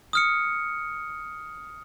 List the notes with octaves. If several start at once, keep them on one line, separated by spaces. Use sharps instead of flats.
D#6 F6 C#7